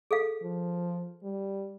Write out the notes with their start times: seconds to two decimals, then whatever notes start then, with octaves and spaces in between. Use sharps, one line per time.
0.11 G#4 A4 F5
0.42 F3
1.23 G3